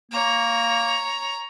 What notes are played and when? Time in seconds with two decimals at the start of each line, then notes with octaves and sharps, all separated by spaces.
0.11 A#3 C#5 A#5